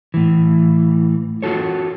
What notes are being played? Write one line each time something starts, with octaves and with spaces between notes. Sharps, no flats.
A2 E3
F4 F#4 A4 C#5